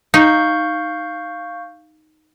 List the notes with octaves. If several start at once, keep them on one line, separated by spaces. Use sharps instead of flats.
D#4 F5 C#6 G6